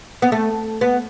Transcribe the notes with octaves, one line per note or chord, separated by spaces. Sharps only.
B3
A3
B3